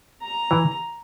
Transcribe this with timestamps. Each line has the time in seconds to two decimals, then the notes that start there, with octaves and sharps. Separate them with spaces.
0.22 A#5
0.51 E3